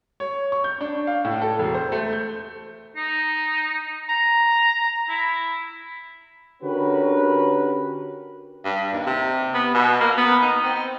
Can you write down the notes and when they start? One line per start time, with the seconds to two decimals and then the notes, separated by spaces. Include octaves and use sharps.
0.20 C#5
0.52 C#6
0.64 G6
0.81 D4
1.07 F5
1.25 A2
1.42 A4
1.59 E1
1.74 C5
1.92 A3
2.13 G6
2.96 D#4
4.09 A#5
5.09 E4
6.62 D3 C#4 F#4 G4 A#4 B4
8.65 G2
8.94 D#2
9.07 C3
9.54 B3
9.74 B2
10.01 A#3
10.18 B3
10.42 D#4
10.64 C4